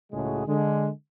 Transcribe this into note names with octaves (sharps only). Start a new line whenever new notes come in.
C#2 A2 C#3 G#3 F#4 G#4
D3 G#3